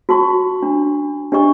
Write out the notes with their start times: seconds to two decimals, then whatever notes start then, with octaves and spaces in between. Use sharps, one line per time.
0.09 F#4 A5 C6 C#6
0.63 D4
1.32 D4 G4 D#5 C#6